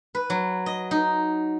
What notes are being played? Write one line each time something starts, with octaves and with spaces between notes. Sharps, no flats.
B4
F#3
D#5
D#4